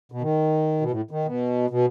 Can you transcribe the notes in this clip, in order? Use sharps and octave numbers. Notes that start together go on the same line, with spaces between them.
B2
D#3
B2
A2
D#3
B2
B2